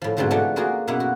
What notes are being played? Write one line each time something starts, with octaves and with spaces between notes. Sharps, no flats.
A2 F3
G#2 B2 D3 F3 C4 F#4
E3 F3 A3 B3 D4 F#4
A#3 F4 F#4 G#4 A#4
F#2 B2 A#3 B3 E4
F#4